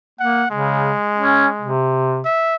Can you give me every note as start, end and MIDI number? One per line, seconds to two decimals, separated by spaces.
0.19 0.44 58
0.19 0.47 78
0.50 0.92 49
0.50 1.72 56
1.18 1.47 61
1.61 2.22 48
2.25 2.55 76